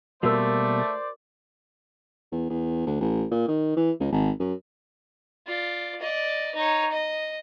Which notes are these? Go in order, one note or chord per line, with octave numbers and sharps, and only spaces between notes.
B2 G3 A3 A#3 F#4 A#4 C5 D5
E2
E2
D2
A1
A#2
D#3
E3
C#2
G#1
F#2
F4 D5
D5 D#5
D#4 C#5
D#5